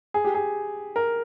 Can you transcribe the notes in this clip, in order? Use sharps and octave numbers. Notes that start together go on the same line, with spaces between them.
G#4
G4
G#4
A#4